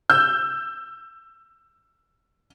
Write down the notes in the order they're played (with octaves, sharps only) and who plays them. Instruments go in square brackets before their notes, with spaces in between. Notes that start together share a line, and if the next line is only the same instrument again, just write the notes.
[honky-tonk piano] E6 G6